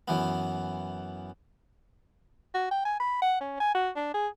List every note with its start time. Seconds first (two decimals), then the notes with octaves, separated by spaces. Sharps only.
0.08 F#2 E3 B3
2.54 F#4
2.71 G5
2.85 G#5
3.00 B5
3.22 F#5
3.41 C#4
3.60 G#5
3.75 F#4
3.96 D4
4.14 G#4